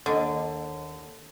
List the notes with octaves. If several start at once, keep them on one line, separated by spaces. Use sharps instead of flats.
D#2 D3 D#5